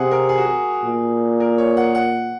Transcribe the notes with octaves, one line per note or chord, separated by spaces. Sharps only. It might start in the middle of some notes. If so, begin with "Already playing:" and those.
Already playing: C3 G#4 F#5
A#4
G#4
F#4
G#4
A#2
A#4
C#5
F#5
F#5